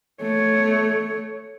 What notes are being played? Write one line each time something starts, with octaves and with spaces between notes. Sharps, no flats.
A3 C#5